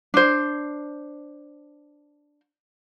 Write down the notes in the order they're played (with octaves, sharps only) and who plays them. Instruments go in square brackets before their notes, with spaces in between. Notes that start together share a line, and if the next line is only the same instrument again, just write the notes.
[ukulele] D4 C5